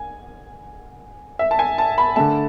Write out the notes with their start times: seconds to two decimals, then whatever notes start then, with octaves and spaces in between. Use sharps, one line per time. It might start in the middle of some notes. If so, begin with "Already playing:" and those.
Already playing: G#5
1.39 E5
1.51 A5
1.59 G#5
1.78 A5
1.98 B5
2.16 D3 A3 A5